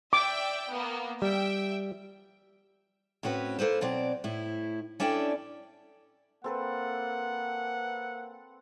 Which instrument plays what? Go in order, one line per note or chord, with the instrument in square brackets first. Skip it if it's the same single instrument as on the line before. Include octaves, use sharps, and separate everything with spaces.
[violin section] D5 E5 G5 [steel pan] D6
[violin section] A#3 B3
[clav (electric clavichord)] G3 [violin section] E5 G5
[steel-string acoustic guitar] A2 C4 C#4 F#4 B4
A#3 A4 B4 C5
B2 F#3 C4 D5
A2 E4
C#4 D4 E4 A4 D5 G5
[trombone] A#3 [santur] C4 A4 B4 [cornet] F#5